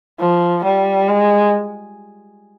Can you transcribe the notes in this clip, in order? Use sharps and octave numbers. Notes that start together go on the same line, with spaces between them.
F3
G3
G#3